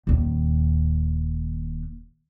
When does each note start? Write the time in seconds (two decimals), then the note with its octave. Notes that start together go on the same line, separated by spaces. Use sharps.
0.07 D#1 D#2